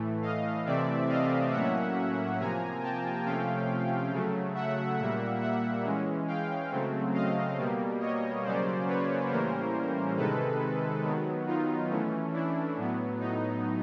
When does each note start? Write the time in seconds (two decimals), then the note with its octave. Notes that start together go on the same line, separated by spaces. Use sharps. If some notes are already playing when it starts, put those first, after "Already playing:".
Already playing: A2 E3 A3
0.22 D#5 F5
0.66 C3 E3 A3 C4 D5 E5
1.08 D#5 F5
1.52 A2 F#3 A#3 C#4 E5 F#5
2.39 C3 F3 A#3 G#5 A#5
2.82 G5 A5
3.25 C3 F3 A3 C#4 F5 G5
4.11 C#3 F#3 A3
4.55 E5 F#5
4.98 A#2 G3 A#3 E5 F#5
5.41 E5 F#5
5.84 E3 G#3 C#4
6.28 F5 G5
6.71 C#3 F#3 A3 C4
7.14 D#5 F5
7.58 B2 G3 A#3
8.00 C#5 D#5
8.44 C#3 F#3 A#3 C#4 C5 D5
8.88 B4 C#5
9.30 A2 E3 G3 A#3 C#4 A#4 C5
10.16 C3 D#3 G#3 A4 B4
11.04 D#3 F#3 B3
11.47 D#4 F4
11.90 E3 A3 C#4
12.33 D4 E4
12.77 A2 F#3 B3
13.20 D#4